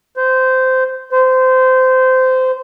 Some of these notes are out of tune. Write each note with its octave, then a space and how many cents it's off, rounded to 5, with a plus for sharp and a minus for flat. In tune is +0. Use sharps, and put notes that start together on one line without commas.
C5 -15
C5 -20